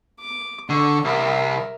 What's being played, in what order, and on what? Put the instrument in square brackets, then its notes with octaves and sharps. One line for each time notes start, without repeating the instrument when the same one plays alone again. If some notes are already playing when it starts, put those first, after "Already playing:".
[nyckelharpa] D6
[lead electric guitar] D3 [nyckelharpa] A4 C#6
[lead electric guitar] C2 [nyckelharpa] A#4 E5